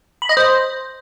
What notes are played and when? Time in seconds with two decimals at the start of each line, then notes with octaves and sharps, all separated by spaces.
0.22 B5
0.29 D#5
0.37 C5